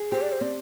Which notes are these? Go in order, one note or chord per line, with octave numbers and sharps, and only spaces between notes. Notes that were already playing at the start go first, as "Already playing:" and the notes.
Already playing: G#4
G4 C5
D5
C5
C4 D5